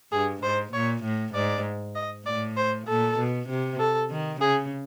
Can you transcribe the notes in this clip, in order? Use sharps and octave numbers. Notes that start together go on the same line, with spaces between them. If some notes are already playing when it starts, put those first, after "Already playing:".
G2 G#4
G#2 C5
A#2 C#5
A2
G#2 D5
D#5
A2 D5
C5
A#2 A4
B2
C3
A4
D#3
C#3 G#4